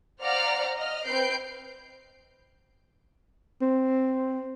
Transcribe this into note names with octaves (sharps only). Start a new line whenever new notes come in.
C5 D5 F5 F#5 A#5 F6
D#5 F6
C4 B4 G6 C7 D7
C4